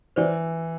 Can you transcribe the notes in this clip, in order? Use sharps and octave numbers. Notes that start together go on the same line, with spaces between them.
E3 C5 D5